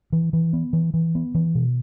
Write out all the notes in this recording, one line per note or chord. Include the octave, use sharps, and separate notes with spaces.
E3
E3
B3
E3
E3
B3
E3
B2